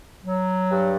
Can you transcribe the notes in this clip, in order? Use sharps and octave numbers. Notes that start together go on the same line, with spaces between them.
F#3
G2